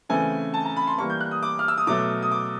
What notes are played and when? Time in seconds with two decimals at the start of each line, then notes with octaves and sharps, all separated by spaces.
0.09 C#3 E3 A3 C4 G#5
0.54 A5
0.65 A#5
0.76 B5
0.87 C6
0.98 E3 G3 A#3 C#6
1.10 G6
1.21 F#6
1.31 D#6
1.43 D6
1.59 F6
1.68 E6
1.78 D#6
1.87 B2 F#3 A3 D6
2.22 D#6
2.31 D6